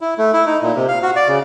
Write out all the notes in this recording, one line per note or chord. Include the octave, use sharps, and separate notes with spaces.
E4
A3
E4
D#4
A#2
C3
F5
F#4
D5
C#3